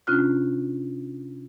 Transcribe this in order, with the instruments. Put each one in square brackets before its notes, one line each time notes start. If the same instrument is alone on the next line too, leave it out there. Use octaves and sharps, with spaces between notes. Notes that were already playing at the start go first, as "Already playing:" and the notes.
[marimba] C3 C#4 D4 F4 F6 F#6